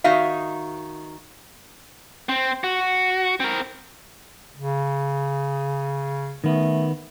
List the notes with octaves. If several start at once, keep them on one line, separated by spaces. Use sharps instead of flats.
D#3 D#4 F#4 E5 F5
C4
F#4
C4 A#4
C#3
D#3 A3 B3